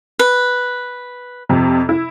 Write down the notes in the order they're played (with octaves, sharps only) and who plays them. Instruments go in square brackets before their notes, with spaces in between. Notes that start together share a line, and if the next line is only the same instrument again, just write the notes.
[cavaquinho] B4
[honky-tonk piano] F2 C3
E4